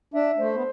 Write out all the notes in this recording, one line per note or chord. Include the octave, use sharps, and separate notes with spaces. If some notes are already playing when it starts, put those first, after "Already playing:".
D4 E5
A3 C5
B3